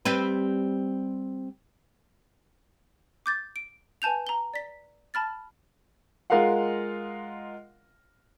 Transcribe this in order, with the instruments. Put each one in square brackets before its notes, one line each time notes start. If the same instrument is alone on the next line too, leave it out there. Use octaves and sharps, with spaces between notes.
[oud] G3 C4 B4
[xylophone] D6 G6 A6
D7
B4 G#5 A5 G6 F7
A#5 G7
D5 B6
A5 B5 F6 A6
[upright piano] G#3 F4 A#4 D#5 F5 F#5